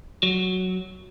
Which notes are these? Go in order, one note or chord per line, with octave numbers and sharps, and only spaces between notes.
F#3